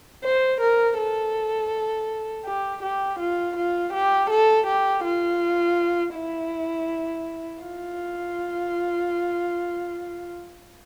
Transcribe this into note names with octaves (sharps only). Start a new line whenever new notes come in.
C5
A#4
A4
G4
G4
F4
F4
G4
A4
G4
F4
E4
F4